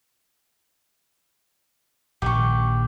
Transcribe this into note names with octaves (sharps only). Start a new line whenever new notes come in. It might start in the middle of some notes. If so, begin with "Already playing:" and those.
A#1 D#3 G4 C#6